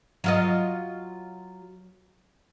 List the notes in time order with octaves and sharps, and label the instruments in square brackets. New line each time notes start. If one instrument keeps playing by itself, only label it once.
[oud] F#3 F4 D#5